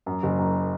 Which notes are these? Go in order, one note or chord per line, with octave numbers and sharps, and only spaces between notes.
F#2
F#1
F#2